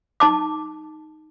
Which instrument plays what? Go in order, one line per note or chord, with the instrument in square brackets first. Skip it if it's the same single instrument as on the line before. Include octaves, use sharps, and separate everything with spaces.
[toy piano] D#4 A5 D6